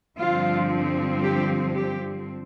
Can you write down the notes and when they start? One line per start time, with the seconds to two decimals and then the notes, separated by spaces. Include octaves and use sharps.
0.17 G2 D3 F3 C4 F4
1.23 G4
1.76 G4